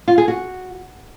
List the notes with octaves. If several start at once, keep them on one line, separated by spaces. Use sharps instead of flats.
F4
G#4
F#4